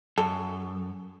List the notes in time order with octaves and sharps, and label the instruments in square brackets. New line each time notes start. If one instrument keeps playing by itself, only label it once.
[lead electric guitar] F#2 [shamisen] A4